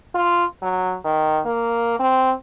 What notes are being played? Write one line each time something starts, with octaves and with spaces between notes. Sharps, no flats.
F4
F#3
D#3
A#3
C4